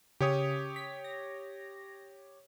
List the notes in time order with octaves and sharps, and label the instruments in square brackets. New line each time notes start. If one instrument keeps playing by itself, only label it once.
[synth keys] C#3 [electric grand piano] G4 C#5 D#6
[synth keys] B6
A#6